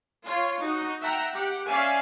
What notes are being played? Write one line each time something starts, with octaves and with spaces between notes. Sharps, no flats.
F4 C#5
D#4 F#4
E5 F#5 G5 A#5
G4 F#5
C#4 D5 E5 F5 G#5